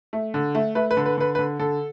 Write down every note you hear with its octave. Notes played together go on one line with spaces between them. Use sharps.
A3
D3
A3
A3 B4
B4
D3
B4
D3 B4
B4
D3
D3 A4